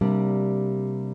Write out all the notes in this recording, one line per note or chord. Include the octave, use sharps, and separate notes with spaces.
C3 G3 A#3 D4